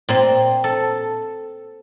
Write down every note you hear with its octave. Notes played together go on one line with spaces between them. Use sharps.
A#2 C4
A4